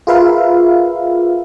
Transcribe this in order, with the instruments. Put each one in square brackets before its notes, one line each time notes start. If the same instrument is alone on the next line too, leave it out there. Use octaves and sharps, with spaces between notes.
[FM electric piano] F4 G#4 A#4 B4 E5 F5